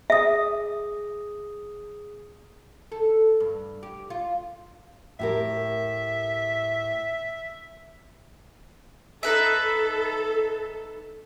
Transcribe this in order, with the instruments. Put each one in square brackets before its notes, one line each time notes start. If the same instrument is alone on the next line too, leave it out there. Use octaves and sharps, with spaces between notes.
[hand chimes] G#4 D#6 [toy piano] E5
[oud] A4
G2
G4
F4
[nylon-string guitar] A2 G4 A#4 [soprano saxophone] E5
[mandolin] D#4 B4 E5 [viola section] A4